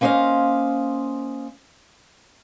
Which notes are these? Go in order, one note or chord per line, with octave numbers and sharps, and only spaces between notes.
A#3 C#4 C5 C#5 D#5 F5